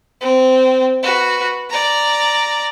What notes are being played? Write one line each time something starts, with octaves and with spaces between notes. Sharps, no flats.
C4
F#4 B4
D5 A#5